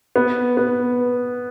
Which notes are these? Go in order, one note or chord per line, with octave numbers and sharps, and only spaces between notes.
B3
B3